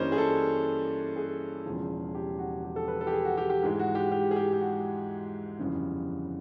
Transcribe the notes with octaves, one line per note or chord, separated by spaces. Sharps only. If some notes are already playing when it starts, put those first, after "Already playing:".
Already playing: G2 E3 G3 A#3 C#4 C5 C#5 D#5
G#4
A4
G#4
E1 E2 C#3 F3
G4
F#4
G4
A4
B4
A4
G4
G#4
F#4
G4
G4
G#2 E3 G#3
F#4
G4
G4
G#4
G4
G4
F#4
G1 F2 C#3 E3 G3